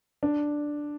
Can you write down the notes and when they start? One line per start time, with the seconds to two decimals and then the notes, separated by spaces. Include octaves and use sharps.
0.23 D4